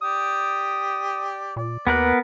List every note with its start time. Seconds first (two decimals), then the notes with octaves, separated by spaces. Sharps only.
0.02 G4 D5 D#6
1.56 A#2 D5
1.87 D#2 B3 A#4 B4 F#6